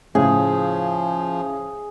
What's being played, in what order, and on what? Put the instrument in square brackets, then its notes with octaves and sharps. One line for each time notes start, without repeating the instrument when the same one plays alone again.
[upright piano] A2 C#3 [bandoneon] F3 [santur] G#4